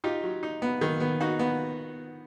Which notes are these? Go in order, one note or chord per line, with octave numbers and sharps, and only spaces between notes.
D#4 F4 G4
F#3
D#4
B3
D#3
B3
D#4 F#4
B3